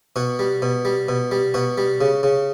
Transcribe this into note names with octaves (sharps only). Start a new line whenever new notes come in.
B2 F#4
G3
B2
G3
B2
G3
B2 F#4
G3
C#3
C#3